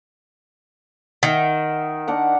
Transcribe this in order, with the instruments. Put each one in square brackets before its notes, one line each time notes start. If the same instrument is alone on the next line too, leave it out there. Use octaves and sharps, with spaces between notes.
[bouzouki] D#3 [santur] E5 F#5
[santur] D4 A#4 F#5